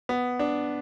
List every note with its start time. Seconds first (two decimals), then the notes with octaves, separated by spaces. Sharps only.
0.09 B3
0.39 D4